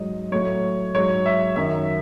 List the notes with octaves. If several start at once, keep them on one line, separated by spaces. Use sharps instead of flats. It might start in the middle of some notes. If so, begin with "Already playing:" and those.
Already playing: G#2 F#3 D#5
A2 F#3 C#5
G#2 F#3 C#5
E5
F#2 D#3 F#3 E5